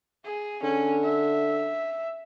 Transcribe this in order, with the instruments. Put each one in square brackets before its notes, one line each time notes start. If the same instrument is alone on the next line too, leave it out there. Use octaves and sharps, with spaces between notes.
[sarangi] G#4
[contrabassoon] D3 [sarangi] C#4
[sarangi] E5